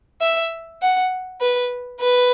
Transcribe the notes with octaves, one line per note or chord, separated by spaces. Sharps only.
E5
F#5
B4
B4